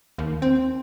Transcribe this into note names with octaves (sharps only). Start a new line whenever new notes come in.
D#2
C4